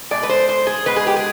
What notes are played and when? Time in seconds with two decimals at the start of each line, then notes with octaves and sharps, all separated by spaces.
0.11 B2 G#3 D5
0.23 B4
0.29 C5
0.49 C5
0.67 G#4
0.86 B2 G#3 B4
0.96 G#4
1.07 G4
1.16 G#4